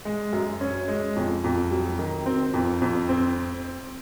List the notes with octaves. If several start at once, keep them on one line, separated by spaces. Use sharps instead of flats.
G#3
F#2
C#4
G#3
F2
F2
F#3
D#3
C4
F2
F2
C4